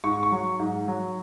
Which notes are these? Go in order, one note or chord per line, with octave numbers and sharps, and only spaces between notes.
G#2 C#6
C#6
F#3
G#2
F#3